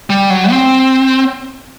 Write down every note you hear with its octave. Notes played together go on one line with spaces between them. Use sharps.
G3
F#3
C4